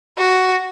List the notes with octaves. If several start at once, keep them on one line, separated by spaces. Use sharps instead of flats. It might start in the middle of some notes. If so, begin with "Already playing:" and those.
F#4